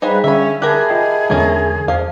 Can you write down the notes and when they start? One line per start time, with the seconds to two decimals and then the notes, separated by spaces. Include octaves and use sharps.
0.02 G3 D#4 G#4 B4 C5 F5 G#5
0.24 D3 C#4 E5 B5
0.62 G4 G#4 A#4 E5 A5 B5 F#6
0.90 F4 D#5 G5
1.30 E2 D3 G#3 A3 C#4 A#4
1.88 E2 F3 F5